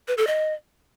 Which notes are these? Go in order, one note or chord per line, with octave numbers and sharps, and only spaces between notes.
B4
A4
D#5